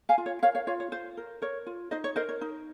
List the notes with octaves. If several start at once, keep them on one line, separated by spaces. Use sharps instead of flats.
F5 G#5
F4
C#5
A#4 C#5 F5
C#5 F5
F4 C#5 F5
C#5
F4 C5
A#4
A#4 C#5
F4
D#4 C5 D#5
C#5
A#4 C5 D#5
C#5
D#4